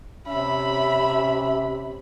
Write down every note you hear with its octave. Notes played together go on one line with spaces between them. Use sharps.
C3 C#4 E5 B5